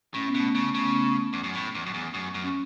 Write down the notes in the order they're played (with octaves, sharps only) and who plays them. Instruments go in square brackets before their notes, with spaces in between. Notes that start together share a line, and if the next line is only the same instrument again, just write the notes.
[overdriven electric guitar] A2 [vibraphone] C#4
[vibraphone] B3
[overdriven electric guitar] B2
[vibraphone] A3
[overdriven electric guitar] C#3 [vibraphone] B3
[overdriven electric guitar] C#3
E2
F#2
A2
E2
F#2
E2
F#2
F#2
[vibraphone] C#4